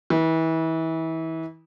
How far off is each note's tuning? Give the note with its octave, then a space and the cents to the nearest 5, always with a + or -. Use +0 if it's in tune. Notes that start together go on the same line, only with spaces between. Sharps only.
E3 -30